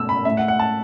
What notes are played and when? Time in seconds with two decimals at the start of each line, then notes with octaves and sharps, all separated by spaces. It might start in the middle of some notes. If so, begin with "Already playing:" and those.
Already playing: B2 A3 E6
0.09 B5
0.25 A2 A3 E5
0.37 F#5
0.48 F#5
0.59 A5